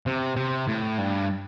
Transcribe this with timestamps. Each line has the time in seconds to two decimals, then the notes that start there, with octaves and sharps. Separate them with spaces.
0.06 C3
0.36 C3
0.68 A2
0.98 G2